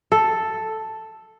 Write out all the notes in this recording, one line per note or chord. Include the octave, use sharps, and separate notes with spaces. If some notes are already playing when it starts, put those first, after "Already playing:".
A4